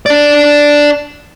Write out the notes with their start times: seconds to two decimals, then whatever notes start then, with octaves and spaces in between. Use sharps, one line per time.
0.06 D4 D5